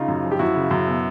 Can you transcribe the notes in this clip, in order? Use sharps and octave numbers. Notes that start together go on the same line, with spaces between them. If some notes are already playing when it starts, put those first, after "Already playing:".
Already playing: C#3 D#4 F4
F#2
F3
G4
F#2 E4 F#4
C#3
F#2
B2